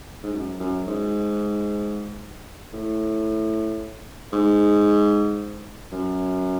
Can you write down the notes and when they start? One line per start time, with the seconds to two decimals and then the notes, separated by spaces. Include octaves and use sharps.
0.23 G#2
0.33 F#2
0.60 F#2
0.87 G#2
2.73 A2
4.33 G#2
5.92 F#2